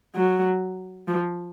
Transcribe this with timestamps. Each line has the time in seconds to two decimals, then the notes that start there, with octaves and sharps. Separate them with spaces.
0.15 F#3
1.07 F3